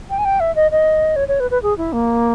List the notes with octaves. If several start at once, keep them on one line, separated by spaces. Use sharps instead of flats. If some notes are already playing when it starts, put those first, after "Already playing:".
G5
G#5
G5
E5
D#5
D#5
C#5
C#5
B4
B4
G#4
E4
A#3